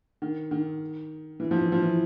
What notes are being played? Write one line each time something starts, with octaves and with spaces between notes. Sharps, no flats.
D#3
D#3
E3
F3
E3
F3
E3